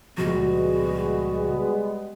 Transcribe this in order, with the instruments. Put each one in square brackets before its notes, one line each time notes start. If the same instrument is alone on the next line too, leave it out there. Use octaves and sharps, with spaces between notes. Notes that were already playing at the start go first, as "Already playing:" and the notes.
[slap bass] C#2 A#2 F3 [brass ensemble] G3 G#3 B3 [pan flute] F#4